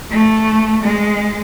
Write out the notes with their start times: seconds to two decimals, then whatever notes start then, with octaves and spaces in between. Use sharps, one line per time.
0.11 A3
0.83 G#3